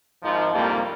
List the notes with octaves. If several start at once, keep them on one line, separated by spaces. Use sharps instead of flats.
G#1 F3 D#4
C2 F2 G#2 C3 G3 A#3